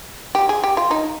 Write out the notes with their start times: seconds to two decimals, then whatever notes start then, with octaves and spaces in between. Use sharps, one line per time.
0.35 G4
0.49 G#4
0.64 G4
0.77 F4
0.91 D#4